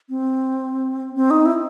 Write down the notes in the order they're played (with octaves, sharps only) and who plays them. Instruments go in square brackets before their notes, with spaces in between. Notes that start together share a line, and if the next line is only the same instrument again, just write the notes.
[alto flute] C4
C4
D#4
E4